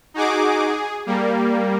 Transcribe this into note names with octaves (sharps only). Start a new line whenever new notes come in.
D#4 F#4 G#4 D6
G#4
G3 A#3